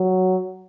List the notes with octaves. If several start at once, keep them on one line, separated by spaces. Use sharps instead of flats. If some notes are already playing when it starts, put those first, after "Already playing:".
Already playing: F#3